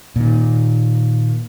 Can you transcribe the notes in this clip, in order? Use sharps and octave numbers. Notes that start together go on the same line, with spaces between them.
A#2 D#3